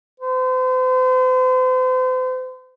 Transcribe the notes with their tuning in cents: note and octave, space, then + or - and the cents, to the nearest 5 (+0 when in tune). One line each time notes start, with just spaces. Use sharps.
C5 -40